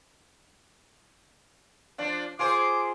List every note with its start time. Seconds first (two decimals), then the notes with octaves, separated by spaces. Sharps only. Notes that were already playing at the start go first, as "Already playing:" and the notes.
1.98 F3 D4
2.39 F4 G#4 C5 D6